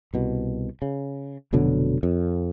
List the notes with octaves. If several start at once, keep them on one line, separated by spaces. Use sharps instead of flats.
C2 B2
C#3
F1 B2 D3 F#3
F2